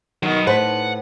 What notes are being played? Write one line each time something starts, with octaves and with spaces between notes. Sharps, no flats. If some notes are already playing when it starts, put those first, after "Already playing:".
D#3 F#3 B3
A2 B4 C5 F#5 A5